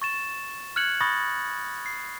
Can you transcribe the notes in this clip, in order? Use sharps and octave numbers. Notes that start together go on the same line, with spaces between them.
C#6 A6 E7
F6 F#6 G#6 C#7 F#7
B5 C#6 D#6 A6 A#6
C7